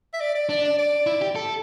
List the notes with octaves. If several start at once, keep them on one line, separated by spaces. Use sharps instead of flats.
E5
D5
D5
D4 D5
D5
D5
E4
G4
A4